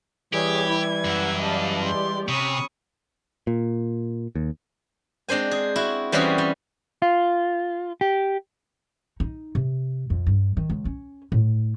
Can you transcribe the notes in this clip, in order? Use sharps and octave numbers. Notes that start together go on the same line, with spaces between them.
E3 G3 G4 G#4 C#5 G#6
E4
F#2 E5 F#5
D5 D#5 F5 A5
G#3 G4 D5 C6
C3 C#4 B5 C#6 D#6
A#2
D#2
G#3 C4 D4 C5 G#5
G#4
E4 F#4
E3 G3 C4 C#4 F#4 G#4
G3
F4
G4
D#4
C3
F2
G2
D#3
C#2
C#4
A2